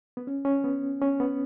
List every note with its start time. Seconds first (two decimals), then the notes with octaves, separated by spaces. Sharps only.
0.17 B3
0.27 C#4
0.45 C#4
0.64 B3
1.01 C#4
1.20 B3